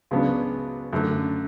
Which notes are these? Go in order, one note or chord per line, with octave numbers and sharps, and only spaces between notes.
C#2 C#3 F#3 B3 D4
F#2 D3 A3